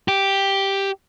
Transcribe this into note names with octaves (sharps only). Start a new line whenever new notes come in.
G4